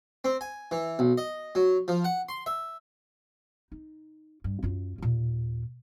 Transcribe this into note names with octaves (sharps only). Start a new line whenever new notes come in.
C4
G#5
E3
B1
D#5
F#3
F3
F#5
C6
E5
D#4
G2
F#2 F4
D#2 A#2